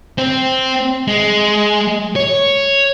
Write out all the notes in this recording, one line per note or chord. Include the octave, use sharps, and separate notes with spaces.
C4
G#3
C#5